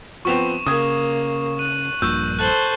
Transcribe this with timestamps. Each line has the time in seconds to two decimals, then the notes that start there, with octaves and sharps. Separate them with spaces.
0.25 F3 B3 C4 C#6 E7 F7
0.66 C#3 A#3 D#6 G#6
1.59 F#6 D#7
2.02 A#1 G2 A#2 C#6 E6 G6
2.39 A4 C5 F#6 F#7 G7